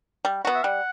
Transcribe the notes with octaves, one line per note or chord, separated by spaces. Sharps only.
G3
B3 F#4
E5
G3 F#5